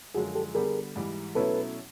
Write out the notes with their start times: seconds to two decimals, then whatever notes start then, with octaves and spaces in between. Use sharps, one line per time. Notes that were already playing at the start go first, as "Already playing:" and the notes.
0.14 F#2 D3 F3 G#3 F#4 G#4
0.35 G4 A4
0.55 D3 G3 B3 G#4 A#4
0.96 G#2 E3 G3
1.35 B2 F#3 A3 C#4 E4 A4 B4